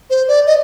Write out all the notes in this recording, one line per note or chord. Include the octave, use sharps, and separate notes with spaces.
C5
D5
D#5